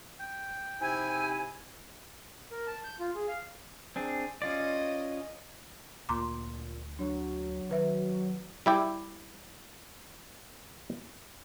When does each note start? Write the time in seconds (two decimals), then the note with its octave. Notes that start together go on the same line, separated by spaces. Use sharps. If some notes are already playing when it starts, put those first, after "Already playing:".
0.19 G5
0.81 C3 D#4 E4 G#5
2.51 A#4
2.67 A5
2.84 G6
3.00 F4
3.15 G#4
3.28 F5
3.96 C4 D4 G#4
4.42 C#4 F4 D5 D#5
6.09 D2 A#2 A#5 C6 D6
6.99 F#3 D4
7.70 D#3 B4 E5
8.66 G3 E4 G4